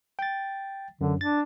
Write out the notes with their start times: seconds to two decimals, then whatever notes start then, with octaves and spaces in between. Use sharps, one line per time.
0.19 G5 A6
1.01 F#2 D3
1.21 D4 A6